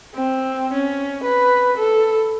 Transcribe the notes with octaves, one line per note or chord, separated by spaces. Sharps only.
C4
C#4
B4
A4